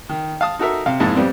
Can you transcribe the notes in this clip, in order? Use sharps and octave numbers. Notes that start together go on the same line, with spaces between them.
D#3
F5 A5 D#6
D#4 F#4 A4 A#4 E5
C3 F5
F2 G#2 G#3 A#3 E4 A5
F2 G3 B3 C4